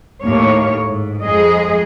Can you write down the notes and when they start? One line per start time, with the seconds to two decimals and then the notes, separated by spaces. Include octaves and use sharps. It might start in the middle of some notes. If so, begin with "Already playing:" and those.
0.23 D#2 A2 A#3 C#5
0.84 G#2
1.22 F2 G#3 G#4 D#5